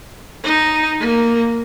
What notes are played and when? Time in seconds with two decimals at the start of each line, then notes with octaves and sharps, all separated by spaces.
0.43 D#4
0.99 A#3